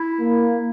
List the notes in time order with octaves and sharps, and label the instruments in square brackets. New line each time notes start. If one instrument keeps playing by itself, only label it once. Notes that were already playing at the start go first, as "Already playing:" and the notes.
Already playing: [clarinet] E4
[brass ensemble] A#3